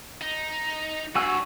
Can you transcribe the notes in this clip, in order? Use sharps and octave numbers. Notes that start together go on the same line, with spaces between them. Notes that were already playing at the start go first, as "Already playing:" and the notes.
D#4
G2 F#4 G#5 E6